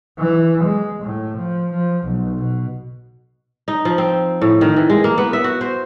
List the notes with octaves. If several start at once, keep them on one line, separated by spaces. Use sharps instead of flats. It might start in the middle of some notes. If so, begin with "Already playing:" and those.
E3
G#3
A2
F3
F3
B1
B2
D#4
F3
C4
A2
D#3
E3
G#3
A#3
B3
E5
F#4
C5